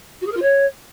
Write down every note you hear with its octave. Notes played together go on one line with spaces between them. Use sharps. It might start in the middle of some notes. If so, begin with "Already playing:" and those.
F#4
G#4
A#4
F4
C#5